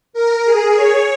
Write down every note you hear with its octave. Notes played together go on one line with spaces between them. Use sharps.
A#4
G#4
C#5